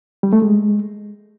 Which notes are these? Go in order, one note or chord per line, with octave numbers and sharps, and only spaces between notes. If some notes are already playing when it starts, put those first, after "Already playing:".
G3
A3
G#3